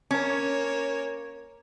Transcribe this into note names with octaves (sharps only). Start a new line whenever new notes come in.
A#3 C#4 C#5